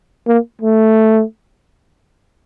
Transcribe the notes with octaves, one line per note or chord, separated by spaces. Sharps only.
A#3
A3